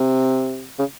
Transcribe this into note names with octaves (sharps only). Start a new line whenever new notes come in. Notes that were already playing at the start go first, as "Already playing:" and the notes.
Already playing: C3
C#3